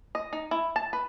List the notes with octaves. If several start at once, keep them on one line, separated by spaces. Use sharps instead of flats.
D#5
D#4
E4
A5
B4